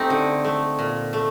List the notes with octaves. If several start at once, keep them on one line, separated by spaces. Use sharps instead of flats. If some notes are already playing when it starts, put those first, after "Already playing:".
Already playing: A3 C4 D#4 G4
D3
A3
A#2
A3